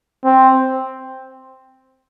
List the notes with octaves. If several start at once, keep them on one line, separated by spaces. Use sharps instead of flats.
C4